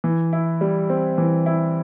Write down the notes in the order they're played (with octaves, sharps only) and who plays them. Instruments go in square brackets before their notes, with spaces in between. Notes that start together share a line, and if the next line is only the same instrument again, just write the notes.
[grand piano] E3
E4
G3
C4
E3
E4